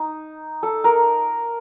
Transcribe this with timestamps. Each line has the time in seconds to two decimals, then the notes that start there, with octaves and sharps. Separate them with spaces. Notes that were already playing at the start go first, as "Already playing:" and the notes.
Already playing: D#4
0.63 A4
0.84 A#4